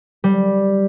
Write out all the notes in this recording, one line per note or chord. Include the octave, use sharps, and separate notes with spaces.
G3